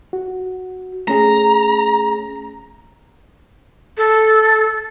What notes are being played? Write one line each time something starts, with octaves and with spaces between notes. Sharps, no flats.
F#4
A3 C#4 G#4 A#5
A4